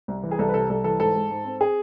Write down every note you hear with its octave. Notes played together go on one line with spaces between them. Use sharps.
C2
E3
G#4
C2 A4
B4
C3 A4
C2 A4
E3 A4
G#2 A4
G#3
G#2
C4
G#4